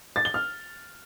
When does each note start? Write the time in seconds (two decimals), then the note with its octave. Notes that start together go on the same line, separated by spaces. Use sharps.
0.16 A6
0.25 G7
0.34 F6